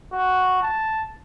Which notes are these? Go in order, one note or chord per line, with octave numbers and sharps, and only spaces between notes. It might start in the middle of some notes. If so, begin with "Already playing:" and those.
F#4
A5